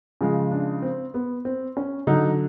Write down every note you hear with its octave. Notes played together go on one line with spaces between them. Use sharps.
C#3 F3 G#3
D4
C4
B3
C4
C#4
D3 F#3 D#4